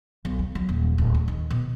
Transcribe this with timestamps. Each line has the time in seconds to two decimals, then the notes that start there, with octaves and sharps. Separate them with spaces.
0.25 B1
0.39 F#3
0.55 F#3
0.69 D#1
0.98 D1
1.15 D2
1.28 D#3
1.50 B2